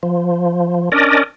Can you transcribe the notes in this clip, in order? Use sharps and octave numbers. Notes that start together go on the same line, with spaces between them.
F3
C#4 D4 A#4 D5 D#5